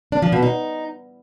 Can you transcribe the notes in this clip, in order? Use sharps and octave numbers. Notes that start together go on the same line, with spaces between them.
D4
F3
B2
D#4